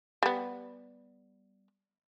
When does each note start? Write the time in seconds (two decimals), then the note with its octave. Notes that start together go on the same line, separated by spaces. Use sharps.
0.23 G3 B3